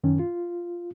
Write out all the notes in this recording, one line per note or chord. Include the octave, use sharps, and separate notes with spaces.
F#2 D#3 C#4
F4